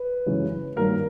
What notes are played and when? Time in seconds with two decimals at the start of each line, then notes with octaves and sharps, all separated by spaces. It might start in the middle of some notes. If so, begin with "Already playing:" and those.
Already playing: B4
0.26 F#2 C#3 E3 G#3 C#4
0.76 G2 D#3 F#3 A#3 A#4